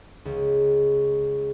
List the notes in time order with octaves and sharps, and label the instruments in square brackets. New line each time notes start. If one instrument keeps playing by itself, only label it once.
[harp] C#2